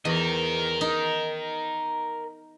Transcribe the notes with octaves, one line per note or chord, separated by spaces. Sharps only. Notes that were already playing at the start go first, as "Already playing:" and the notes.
E2 A#4 D#5
D#4